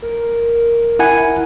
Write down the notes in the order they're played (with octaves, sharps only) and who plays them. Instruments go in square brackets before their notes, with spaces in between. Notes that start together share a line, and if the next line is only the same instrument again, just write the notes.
[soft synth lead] A#4
[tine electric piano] E4 F#5 G#5